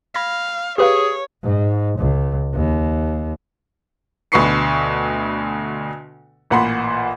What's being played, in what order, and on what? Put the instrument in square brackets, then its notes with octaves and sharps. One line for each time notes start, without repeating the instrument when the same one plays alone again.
[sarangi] F5 [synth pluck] B5 G#6 A#6
[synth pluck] G4 B4 F5 [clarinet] G#4 [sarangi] C#5
[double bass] G#2
C#2
D#2
[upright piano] D2 B2 B4 C#6 C7 C#7
A1 A#2 F#5 B5 C6